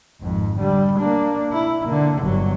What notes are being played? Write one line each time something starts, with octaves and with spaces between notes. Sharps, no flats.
G#1 F2
D3 G3
A#3 D4
E4
D3 A#3
G1 F#3